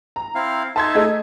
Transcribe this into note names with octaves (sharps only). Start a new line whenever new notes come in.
A#5
C4 E4 F5
D#4 A4 E5 A5 C6 G#6
A3 G#4 D#5